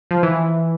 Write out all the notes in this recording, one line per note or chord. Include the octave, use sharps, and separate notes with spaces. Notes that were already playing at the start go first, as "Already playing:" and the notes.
F3
E3